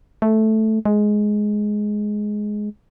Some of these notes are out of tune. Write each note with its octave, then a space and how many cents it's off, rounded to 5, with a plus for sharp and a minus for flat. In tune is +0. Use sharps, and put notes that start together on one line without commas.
A3 -5
G#3 +10